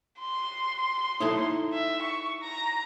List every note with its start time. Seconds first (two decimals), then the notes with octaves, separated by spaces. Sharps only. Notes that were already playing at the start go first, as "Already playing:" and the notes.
0.19 C6
1.20 D#4 E4 A4
1.73 E5
2.02 C#6
2.42 A#5